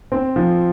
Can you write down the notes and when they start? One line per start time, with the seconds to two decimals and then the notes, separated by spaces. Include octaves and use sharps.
0.12 C4
0.36 F3